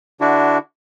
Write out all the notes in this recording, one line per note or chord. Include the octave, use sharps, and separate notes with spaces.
D3 D4 E4 F#4